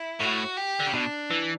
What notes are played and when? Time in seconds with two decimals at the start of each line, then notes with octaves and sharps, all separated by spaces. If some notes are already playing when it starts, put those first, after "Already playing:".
Already playing: E4
0.20 A2 F#4
0.57 G4
0.80 D3
0.87 C#3
0.94 B2 D4
1.31 E3